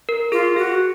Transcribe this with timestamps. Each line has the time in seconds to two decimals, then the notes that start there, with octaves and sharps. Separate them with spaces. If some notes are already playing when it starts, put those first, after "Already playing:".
0.09 A#4
0.32 F4 G#4
0.57 F#4 G#4